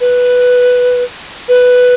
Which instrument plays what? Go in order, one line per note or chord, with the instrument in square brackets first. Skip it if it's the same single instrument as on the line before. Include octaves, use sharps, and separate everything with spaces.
[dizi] B4
B4